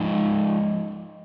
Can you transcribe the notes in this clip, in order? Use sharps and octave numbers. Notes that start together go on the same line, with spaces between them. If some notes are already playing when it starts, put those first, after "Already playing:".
Already playing: F3 G#3 D#4 D#5 G5